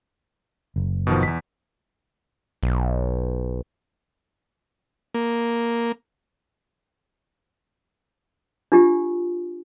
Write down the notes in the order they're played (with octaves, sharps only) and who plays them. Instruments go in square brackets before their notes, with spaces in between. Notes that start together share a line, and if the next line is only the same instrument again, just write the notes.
[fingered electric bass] F#1
[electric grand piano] B2 D#3 F3
E2 B6
[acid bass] B1
[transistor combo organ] A#3
[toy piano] D4 F4 G4